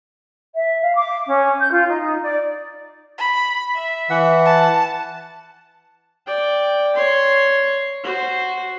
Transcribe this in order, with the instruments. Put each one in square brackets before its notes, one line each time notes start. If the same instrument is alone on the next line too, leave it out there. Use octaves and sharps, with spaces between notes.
[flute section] E5
F5
D6
C#4
G6
F4
D#4
D5
[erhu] B5
E5
[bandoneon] E3 F#5
[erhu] A5
[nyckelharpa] D5 G5
C#5 C6
F#4 C5